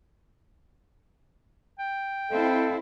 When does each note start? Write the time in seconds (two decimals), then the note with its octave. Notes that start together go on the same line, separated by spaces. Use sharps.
1.79 G5
2.30 C4 E4 A4 D#5 F5